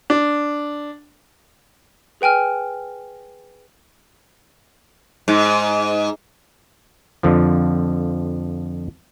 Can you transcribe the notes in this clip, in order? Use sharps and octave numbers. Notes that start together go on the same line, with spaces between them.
D4
G#4 B4 G5 G#5 F6
G#2
F2 D3 F3